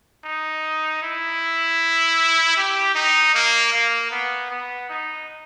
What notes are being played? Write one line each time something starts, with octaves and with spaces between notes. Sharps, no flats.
D#4
E4
G4
D#4
A#3
A#3
B3
B3
D#4